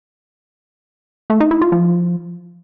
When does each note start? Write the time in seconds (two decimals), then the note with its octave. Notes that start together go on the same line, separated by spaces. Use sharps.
1.30 A3
1.40 D#4
1.51 E4
1.61 F4
1.72 F3